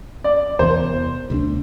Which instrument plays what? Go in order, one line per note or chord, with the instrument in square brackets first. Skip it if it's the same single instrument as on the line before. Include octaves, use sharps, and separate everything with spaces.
[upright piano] D5
[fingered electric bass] E2 C3 E3 B3 [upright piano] C5
[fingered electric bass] D2 C3 G#3 D4